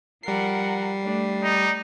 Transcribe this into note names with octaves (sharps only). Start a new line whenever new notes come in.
F3 G3 A#4 F#5 C7
A3 D4
D#4 D5